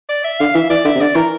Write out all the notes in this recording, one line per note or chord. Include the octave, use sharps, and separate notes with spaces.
D5
E5
D3 F5
E3 E5
E3 D5
D3 E5
C3
D3 D5
E3 A#4